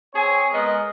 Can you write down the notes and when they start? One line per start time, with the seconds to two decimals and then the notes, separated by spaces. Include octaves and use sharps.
0.14 C4 G#4 C#5 G#5
0.52 G#3 B3 A#4 D#5